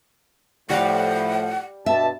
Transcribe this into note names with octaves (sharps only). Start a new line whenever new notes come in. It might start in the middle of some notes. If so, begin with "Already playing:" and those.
A2 F3 G3 F5 F#5
G2 B2 E5 A5